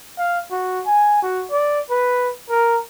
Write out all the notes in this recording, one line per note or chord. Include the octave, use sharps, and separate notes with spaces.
F5
F#4
G#5
F#4
D5
B4
A#4